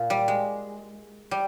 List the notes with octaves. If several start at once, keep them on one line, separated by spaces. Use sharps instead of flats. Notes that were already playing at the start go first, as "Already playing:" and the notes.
Already playing: A#2
G3
G#3
G3